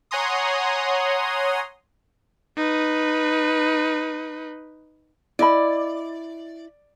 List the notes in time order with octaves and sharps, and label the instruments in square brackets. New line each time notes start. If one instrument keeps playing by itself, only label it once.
[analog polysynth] C#5 F#5 G#5 A#5 C6 D#6
[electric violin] D#4 B4
[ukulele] E4 D#5 B5 [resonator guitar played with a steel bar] D5